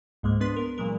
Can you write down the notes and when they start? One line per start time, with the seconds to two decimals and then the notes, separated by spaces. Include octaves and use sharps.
0.23 C#2 G#2 G#3 A#3
0.40 B3 D4 B4 C6 B6
0.56 A#4
0.78 A#2 E3 F#3 G#3 A#4